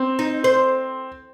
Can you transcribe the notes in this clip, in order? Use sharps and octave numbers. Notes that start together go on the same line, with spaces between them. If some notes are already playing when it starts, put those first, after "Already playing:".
Already playing: C4
D#4
C5